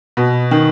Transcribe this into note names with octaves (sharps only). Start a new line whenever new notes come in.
B2
D#3